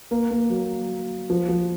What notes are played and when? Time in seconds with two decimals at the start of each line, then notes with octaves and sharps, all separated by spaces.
0.11 A#3
0.31 A#3
0.50 F#3
1.30 F3
1.49 F3